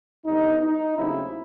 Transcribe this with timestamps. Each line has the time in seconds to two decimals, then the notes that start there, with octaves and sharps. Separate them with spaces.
0.25 F2 D3 G3 B3 D#4
0.61 D#4
0.97 D#2 C#3 F#3 A3 C4 E4